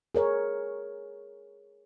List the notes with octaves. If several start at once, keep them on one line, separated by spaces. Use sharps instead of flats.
G#4 A#4 C#5